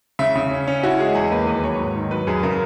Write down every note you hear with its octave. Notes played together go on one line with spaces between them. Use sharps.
C#3 E5
C#3
C#4
C#4
E4 F#4
G#3 G#4
E2 G#4
A#3 B4
D#2 B4
F#3 C#5
G#2
D#3
F#3 B4
F#2 G#4
C#3 A#4